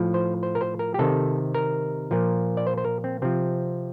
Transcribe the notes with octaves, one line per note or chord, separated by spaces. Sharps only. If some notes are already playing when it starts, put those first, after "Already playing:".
Already playing: A2 F3
C5
C5
A#4
C5
A#4
G4
C3 D#3 A4
A#4
A#2 F3
D5
C5
C5
A#4
C4
C3 F3 C4